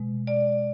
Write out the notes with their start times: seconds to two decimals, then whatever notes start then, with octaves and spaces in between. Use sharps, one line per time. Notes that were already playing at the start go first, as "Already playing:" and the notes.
Already playing: B2 G#3
0.27 D5